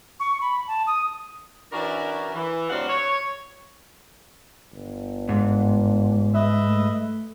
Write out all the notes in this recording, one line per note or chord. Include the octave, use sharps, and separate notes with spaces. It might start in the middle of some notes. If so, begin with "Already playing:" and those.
C#6
B5
A5
D#6
E3 C#4 D4 F#4 A#4
E3
D2 F#3 G3 C4 F5 F#5
C#5
G1
G#2
B4 D#5 E5
A3